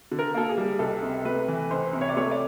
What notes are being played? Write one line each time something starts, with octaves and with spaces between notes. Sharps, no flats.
D3
A#4
A#3 A4
G#4
G3
C#2 A4
C3
A3 B4
E3
C#2 C5
C3
C#5
D5
A3 C#5
D5